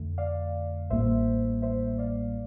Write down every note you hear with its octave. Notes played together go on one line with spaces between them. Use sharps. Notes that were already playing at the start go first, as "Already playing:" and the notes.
Already playing: F2 D3 A3
D5 F5
A1 A2 G3 A#3 C5 E5
C5 E5
D5 F5